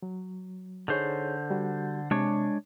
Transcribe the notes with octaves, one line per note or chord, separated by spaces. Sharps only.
F#3
D3 D#4 G#4 C5 C#5
G3 F#4
C3 G#3 D4 C#5